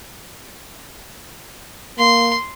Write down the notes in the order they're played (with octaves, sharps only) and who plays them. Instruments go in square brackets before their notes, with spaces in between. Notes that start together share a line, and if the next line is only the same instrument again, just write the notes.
[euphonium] A#3 [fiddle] C6